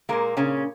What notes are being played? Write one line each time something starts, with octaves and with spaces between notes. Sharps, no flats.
A#2 G#3 A#3 A#4
C#3 C#4